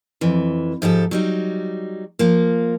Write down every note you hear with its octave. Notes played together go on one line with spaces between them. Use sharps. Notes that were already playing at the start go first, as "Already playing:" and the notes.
F2 E3
G#2 F3 G4 A4
F#3 G3 D#4
F3 A#3